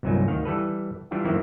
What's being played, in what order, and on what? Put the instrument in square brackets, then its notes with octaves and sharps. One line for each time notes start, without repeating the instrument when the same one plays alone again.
[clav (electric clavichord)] G1 C2 A#2 F#3 D#4 G#5
D2 D#3 F5
E3 G3 A4 B4
E3 G3 D4 E4 F4
F#2 D#3 E3 A#3 C4 E4